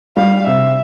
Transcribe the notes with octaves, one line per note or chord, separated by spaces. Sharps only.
G3 F5
C3 E5